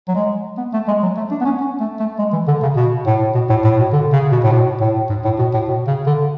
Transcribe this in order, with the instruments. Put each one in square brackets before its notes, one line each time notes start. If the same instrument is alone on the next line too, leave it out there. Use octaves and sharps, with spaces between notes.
[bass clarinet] F#3
G#3
B3
A3
G#3
F#3
A3
D4
B3
C#4
C#4
A3
A3
G#3
E3
D3
C#3
B2
A2
B2
A2
A2
B2
D3
C#3
B2
A2
B2
A2
G#2
A2
B2
A2
B2
C#3
D3